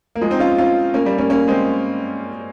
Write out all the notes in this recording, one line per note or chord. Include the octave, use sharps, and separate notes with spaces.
A#3
F3 G#3
C4 D#4
C#4 F4
C#4 F4
A#3 C#4
G3 A#3
A#3 C#4
A#3 C#4
G#3 C4